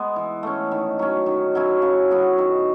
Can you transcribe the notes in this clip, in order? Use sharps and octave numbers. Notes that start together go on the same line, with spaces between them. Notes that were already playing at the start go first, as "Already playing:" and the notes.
Already playing: G#3 B3
E3
A3 C#4
D#3
F#3 C#4
D#3
F#3 C#4 E4
C#3
F#3 B3 F#4
D#3